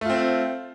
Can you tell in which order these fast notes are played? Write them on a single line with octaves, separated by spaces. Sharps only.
A3 F4 C4